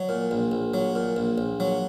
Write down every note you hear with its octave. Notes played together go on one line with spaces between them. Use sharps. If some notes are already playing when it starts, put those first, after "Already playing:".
Already playing: F#3
A#2
A#1
A#1
F#3
A#2
A#1
A#1
F#3